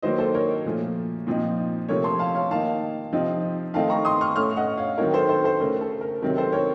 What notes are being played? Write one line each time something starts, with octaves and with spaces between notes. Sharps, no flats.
D#3 F#3 A#3 C5 D#5
A4 C5
A#4 C#5
A#2 F3 A3
A#2 F3 C4 D#4
C3 F3 A3 A#4 C#5
A5 C6
F5 A5
C#5 F5
D#3 A#3 D#4 F5 A5
C3 F3 C4 D#4
D#3 A3 C4 D#4 F5 A5
A#5 C#6
C6 D#6
C#6 F6
A2 A3 C#4 C#6 F6
D#5 F#5
C#5 F5
D#3 F#3 C4 D#4 A#4 C#5
A4 C5
A4 C5
A4 C5
C#3 A3 C#4 A#4
A4
A#4
C3 D#3 F#3 C4 A#4
A4 C5
A#4 C#5